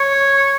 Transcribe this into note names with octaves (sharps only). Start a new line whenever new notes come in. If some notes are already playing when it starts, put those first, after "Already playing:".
Already playing: C#5